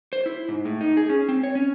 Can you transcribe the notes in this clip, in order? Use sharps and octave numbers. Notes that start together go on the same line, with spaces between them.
C5
E4
G#2
A2
D#4
G#4
C#4
C4
C#5
C#4